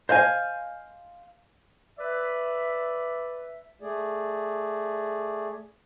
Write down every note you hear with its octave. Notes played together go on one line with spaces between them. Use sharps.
C5 D#5 F5 G#5
B4 D5 E5
A3 G#4 D5